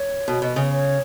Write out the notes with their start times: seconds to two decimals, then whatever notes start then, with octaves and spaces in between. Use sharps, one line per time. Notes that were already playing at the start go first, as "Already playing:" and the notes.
Already playing: C#5
0.28 B2
0.42 B2
0.56 C#3
0.71 C#5